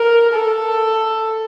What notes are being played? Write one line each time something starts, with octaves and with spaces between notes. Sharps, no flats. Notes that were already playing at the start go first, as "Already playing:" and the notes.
Already playing: A#4
A4